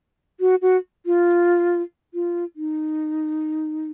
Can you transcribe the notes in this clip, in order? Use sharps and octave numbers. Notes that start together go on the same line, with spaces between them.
F#4
F#4
F4
F4
D#4